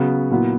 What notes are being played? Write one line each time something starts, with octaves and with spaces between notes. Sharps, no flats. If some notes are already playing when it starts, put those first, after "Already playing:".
Already playing: C#3 F#3 B3
A#2 F#3 B3 E4